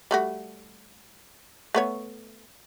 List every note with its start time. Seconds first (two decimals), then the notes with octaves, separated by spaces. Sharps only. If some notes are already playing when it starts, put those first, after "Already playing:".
0.11 G3 A3 F#4
1.75 A3 B3 C#5